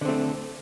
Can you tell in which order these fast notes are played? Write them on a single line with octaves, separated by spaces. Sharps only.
D3 C4 A3